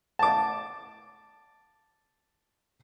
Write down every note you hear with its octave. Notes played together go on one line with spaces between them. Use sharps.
A5 D6